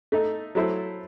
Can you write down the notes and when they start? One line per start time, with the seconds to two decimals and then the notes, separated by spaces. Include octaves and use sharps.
0.12 A3 D#4 A4
0.55 F#3 A3 E4 A4 C5